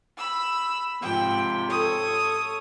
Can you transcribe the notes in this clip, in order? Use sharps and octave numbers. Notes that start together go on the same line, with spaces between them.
B5 E6
G#2 C3 F3 G5
A4 C#5 D#6